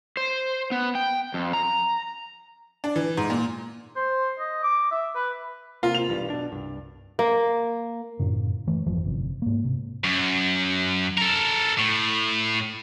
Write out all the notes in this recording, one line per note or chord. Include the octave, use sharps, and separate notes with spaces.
C5
B3
G5
F2
A#5
D4
E3
G#2
A#2
C5
D#5
D6
E5
B4
C3 A#3 F4
F7
B1 E2 G2
B2 D4
C2 G2
A#3
F#2 A2 C#3
E3 A3
G#1 F2 E3 F3
G1 C3
G#2 A#3
C3
F#2
A4 A#4
A2